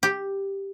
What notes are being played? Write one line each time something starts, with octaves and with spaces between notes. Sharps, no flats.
G4